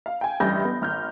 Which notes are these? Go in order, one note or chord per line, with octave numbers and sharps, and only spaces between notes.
F5
G5 G#5
A1 G2 E5 B5 G6 A#6
B3
G#1 F6 G6